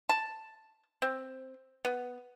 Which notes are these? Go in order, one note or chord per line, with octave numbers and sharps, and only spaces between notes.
A5
C4
B3